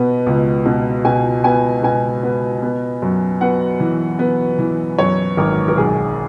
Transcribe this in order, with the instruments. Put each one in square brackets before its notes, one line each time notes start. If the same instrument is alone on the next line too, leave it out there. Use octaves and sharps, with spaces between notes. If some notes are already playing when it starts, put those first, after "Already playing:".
Already playing: [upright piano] B2 B3
C#2
B2
B2 G#5
B3 G#5
B2 G#5
B3
B3
F#2
B3 F#5
E3
B3
E3
F#2 C#5
G#1 A#4
A#4
B1 G#4